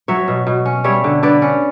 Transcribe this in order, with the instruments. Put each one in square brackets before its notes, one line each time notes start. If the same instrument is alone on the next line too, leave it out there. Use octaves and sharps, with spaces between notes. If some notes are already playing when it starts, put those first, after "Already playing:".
[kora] F#3 C#5 E5
B2
B2
C#4
G3 C#5 E5
D3
D3 B4 D5
C#4